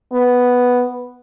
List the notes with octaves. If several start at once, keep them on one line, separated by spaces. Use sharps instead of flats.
B3